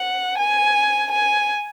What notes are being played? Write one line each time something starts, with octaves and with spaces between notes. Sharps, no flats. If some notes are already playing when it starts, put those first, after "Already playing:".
Already playing: F#5
G#5
G#5